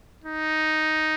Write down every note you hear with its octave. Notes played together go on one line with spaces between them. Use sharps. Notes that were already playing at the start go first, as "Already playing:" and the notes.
D#4